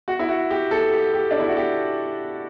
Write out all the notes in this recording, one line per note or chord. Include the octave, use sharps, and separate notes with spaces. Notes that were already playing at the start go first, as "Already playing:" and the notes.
F#4
E4
F#4
G4
A4
G4
G4
D4
E4
F#4
G4